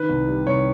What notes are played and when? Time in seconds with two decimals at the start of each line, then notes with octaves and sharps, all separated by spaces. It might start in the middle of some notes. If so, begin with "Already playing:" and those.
Already playing: D#3 B4
0.09 C2
0.28 G3
0.47 C2 C#5